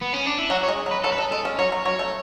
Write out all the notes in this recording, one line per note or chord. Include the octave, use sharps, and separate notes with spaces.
B3
C#4
D4
E4
F#3 F#4
C#5
G#3
F#3
B4
F#3 A4
B4
G#3 A4
G#3 A4
C#4
F#3 C#5
F#3
F#3 C#5
A3